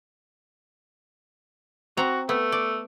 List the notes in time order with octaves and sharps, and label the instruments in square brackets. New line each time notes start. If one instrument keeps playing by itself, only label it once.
[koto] C4 A#5 [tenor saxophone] F#4
[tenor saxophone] A3 [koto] B3
[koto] D5